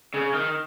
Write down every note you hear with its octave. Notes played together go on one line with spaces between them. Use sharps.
C#3
D#3